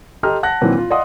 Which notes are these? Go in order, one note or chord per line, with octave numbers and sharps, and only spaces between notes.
G4 A4 D#5 A#5 C6 F6
F#5 A5 F#6 A#6
A#2 D#3 E3 F#3 C4
F4
D5 D#5 F5 F#5 C6 D#6